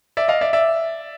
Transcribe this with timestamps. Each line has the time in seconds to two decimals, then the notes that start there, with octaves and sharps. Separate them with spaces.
0.17 D5 E5
0.28 D#5 F5
0.41 D5 E5
0.53 D5 E5